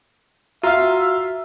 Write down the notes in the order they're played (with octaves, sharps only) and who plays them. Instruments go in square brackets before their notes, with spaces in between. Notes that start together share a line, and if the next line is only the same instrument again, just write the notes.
[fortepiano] F4 F5 [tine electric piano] F#4 A#5 F6 [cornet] E5